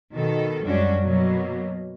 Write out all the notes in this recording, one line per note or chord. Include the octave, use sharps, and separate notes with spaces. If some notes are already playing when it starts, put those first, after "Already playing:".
B2 D#3 A4
F#2 G3 G#3 C#4 D4 F#4
B2 F#3 A#3